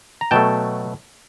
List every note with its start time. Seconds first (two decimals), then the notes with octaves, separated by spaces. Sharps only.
0.21 A#5
0.31 B2 F#3 A3 G5 A5